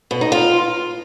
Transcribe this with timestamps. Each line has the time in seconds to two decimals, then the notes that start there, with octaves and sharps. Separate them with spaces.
0.11 B2
0.21 D#4
0.32 F4